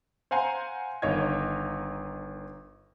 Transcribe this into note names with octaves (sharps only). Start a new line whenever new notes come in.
C5 F5 F#5 G#5 A#5 C6
G1 D#3 C#5 D#5 F5 G#6